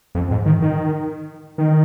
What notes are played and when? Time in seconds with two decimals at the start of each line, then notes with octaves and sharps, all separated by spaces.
0.15 F2
0.31 G#2
0.46 D#3
0.62 D#3
1.58 D#3